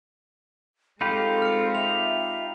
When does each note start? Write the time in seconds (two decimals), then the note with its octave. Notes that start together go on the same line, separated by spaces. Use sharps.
1.01 G#3 C4 D#4 F4 G4 A4 B5
1.42 F6 C#7
1.75 E5 F7